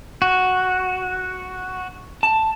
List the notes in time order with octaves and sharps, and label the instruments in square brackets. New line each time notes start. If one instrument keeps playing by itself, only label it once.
[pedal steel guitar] F#4
[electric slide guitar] A5